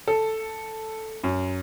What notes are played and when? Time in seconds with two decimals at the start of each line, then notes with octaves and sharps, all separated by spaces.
0.08 A4
1.23 F#2